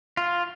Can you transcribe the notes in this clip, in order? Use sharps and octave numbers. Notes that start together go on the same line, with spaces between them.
F4